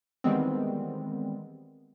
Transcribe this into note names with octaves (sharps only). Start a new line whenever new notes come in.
D#3 E3 G3 G#3 B3 C4